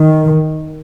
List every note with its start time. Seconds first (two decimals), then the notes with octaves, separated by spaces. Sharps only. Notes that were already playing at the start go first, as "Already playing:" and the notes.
Already playing: D#3